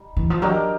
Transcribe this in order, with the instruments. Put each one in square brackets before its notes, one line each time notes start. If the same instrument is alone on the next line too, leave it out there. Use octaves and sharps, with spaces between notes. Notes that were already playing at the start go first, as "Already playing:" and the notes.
Already playing: [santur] G3 D#4
[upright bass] E3
F3
[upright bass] F#3 [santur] D4 G4 A#4 D#5